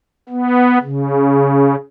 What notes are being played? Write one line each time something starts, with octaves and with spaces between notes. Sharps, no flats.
B3
C#3